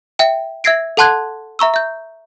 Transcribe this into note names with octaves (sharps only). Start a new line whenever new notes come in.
E5 G5
E5 E6 G#6 A#6 C7 D7
A4 F#5 A5 C6 F#6 G#6
E5 A#5 C#6 E6
E5 G6